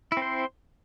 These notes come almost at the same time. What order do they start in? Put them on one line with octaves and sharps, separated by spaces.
E4 C4 C5